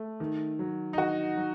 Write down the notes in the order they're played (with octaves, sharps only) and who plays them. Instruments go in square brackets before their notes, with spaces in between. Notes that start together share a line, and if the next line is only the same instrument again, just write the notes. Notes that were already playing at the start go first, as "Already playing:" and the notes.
Already playing: [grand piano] A3
D#3
F#3
[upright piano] D#4
[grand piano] D#3 [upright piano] F#4
[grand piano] F#3